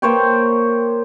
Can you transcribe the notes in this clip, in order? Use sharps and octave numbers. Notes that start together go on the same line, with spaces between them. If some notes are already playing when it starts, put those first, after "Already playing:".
A#3 C5 C#5 G5